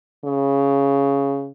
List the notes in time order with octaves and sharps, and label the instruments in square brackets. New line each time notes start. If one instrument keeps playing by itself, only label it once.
[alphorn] C#3